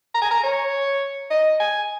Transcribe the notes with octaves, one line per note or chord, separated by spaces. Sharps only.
A#5
G#5
A#5
C#5
D#5
G#5